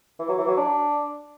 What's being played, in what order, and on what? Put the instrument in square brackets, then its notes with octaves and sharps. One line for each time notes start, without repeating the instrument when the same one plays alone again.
[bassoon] E3
F#3
E3
F#3
D4